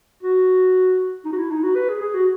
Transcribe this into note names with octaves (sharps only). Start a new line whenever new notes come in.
F#4
D#4
F#4
E4
D#4
F#4
B4
G#4
G#4
F#4